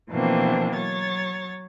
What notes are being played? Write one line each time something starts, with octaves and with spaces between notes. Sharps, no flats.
B2 E3 F3 A#3 C4 D4
F#3 C#5 A6